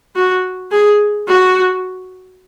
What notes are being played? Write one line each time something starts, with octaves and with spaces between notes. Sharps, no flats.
F#4
G#4
F#4